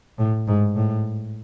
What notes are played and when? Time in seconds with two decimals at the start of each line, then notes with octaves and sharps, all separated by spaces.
0.18 A2
0.47 G#2
0.76 A2